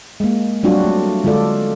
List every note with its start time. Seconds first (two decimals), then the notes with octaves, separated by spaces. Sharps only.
0.20 G#3 A#3
0.63 F#3 G3 C4 D4 F4 F#4
0.84 A3
1.24 D3 G#3 F4 A4 D5